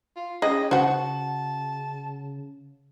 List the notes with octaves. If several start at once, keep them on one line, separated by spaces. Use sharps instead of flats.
F4
C#4 G4 G#4 D#5
C#3 F#4 C5 F#5 A5